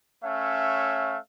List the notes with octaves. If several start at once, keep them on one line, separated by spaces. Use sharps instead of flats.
A3 C#4 C#5 E5 F5